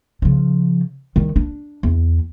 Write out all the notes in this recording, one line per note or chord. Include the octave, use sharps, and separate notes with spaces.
C#3 F3
D#3 G3
D4
E2